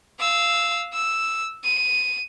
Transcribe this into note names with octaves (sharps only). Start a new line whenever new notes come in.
F5 E6
E6
D#7